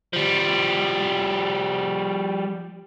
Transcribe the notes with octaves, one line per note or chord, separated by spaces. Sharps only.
F3 G3